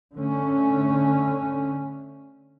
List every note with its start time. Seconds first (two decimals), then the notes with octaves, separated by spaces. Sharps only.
0.13 D3 A3 C#4